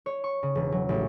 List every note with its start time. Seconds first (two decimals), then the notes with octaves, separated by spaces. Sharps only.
0.06 C#5
0.24 C#6
0.43 C#3
0.55 E1
0.72 F#3
0.89 A1